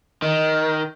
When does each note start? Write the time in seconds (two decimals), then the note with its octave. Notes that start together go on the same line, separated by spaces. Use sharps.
0.22 D#3